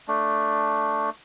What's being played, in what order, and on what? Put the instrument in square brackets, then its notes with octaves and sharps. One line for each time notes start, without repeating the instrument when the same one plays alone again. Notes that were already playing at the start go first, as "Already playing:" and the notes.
[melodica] A3 D4